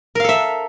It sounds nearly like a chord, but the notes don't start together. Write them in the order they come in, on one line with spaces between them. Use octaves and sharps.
A#4 F5 A4 E5